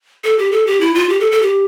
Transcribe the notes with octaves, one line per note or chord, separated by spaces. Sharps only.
A4
G4
A4
G4
E4
F4
G4
A4
A4
G4